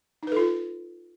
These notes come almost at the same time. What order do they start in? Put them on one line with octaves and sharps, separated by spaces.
D#4 B4 A4 F4